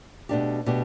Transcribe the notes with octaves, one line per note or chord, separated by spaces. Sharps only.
B2 A3 D4 G4
B2 A3 D4 G4